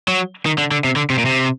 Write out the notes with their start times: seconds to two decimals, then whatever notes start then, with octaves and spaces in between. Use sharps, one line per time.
0.08 F#3
0.46 D#3
0.58 D3
0.71 D3
0.84 C3
0.96 D3
1.10 C3
1.18 A#2
1.25 C3